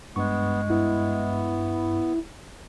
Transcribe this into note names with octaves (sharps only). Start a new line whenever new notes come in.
G2 G#3 B3 C#6
B3 E4